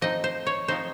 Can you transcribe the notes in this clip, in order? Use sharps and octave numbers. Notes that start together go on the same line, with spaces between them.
F3 C4 D#4 D#5
C5
C#5
F3 C4 D#4 C5